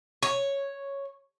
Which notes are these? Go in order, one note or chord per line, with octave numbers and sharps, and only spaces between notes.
C#5